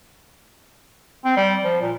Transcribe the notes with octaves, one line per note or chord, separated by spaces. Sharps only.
C4
G3
F3
A#2